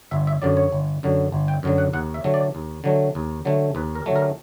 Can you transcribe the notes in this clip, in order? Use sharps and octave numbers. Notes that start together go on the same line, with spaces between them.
G1 E5
E5
F#2 D3 F#3 D5
C#5
G1
F#2 D3 F#3
G1
G5
F#2 D3 F#3
F#5
D#2 F#5
E5
D3 F#3 A3
D5
D#2
D3 F#3 A3
D#2
D3 F#3 A3
D#2 B4
A#4
D3 F#3 A3
A#4